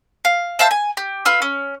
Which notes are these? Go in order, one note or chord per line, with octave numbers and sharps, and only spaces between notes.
F5
C5 E5 F5 A5
G#5
G4
F4 B4 E6
C#4